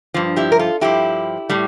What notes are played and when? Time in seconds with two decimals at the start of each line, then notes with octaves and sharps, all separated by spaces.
0.14 G2 F3
0.36 E4 G4
0.52 A#4
0.59 F4 A4
0.81 G2 F3 E4 G4
1.49 A2 G3